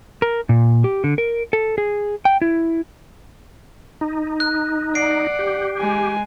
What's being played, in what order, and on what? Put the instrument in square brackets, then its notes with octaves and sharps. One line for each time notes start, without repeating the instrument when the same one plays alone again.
[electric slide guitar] A#4
A#2
G4
D3
A#4
A4
G#4
G5
E4
[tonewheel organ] D#4
[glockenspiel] F#6
[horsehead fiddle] D5 F#5 [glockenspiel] C7 D7
[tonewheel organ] G4
[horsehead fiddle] G#3 G#5